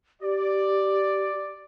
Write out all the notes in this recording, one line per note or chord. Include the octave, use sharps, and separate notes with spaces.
G4 D5